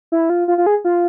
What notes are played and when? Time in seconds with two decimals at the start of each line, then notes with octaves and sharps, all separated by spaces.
0.12 E4
0.30 F4
0.48 F4
0.58 F4
0.66 G#4
0.85 F4